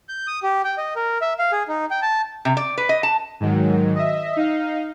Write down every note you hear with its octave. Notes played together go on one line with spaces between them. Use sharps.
G6
D#6
G4
G5
D#5
A#4
E5
F5
G#4
D#4
G5
A5
C3
D5
B4
D#5
A5
G#2 D#3 F#3
D#5 E5
D#4 F5